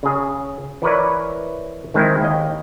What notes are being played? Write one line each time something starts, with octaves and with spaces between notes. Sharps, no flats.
C#3 G#4
E3 E4 A#4 B4 C#5 D5
D#3 G#3 C4 E4
D#2 D#5